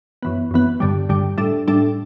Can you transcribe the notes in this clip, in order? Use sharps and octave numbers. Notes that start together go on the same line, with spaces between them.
F#2 E3 B3
F#2 E3 B3
G2 D3 G3
G2 D3 G3
A2 G3 D4 A4
A2 G3 D4 A4